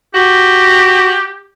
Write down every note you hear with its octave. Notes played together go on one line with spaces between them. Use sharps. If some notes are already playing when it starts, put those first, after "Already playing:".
F#4 G4